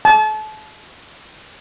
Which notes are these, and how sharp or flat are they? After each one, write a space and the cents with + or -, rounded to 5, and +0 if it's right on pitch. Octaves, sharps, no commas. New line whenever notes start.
A5 -35